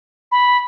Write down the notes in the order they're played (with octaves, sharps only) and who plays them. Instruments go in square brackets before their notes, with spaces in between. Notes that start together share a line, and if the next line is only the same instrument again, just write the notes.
[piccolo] B5